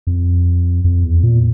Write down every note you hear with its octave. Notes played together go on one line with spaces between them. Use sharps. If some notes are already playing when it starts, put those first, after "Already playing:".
F2
F2
E2
A#2